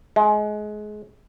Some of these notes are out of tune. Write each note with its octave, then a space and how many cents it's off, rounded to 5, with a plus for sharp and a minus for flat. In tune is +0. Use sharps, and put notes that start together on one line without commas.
G#3 +25